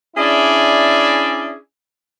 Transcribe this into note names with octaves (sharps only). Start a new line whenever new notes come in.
C#4 D4 E4 G#4 D5 E5